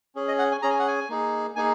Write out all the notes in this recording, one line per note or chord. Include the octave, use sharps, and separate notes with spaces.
C#4 G#4
D#5
F#5
G#5
C#4 G#4 A#5
G#5
F#5
G#5
A#3 D#4 G#4
A#3 D#4 G#4 G#5